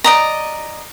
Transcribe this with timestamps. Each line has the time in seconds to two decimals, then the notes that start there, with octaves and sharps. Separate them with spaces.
0.04 D5 D#5 A#5